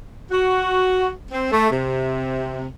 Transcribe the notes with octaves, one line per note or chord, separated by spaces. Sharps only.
F#4
C4
A3
C3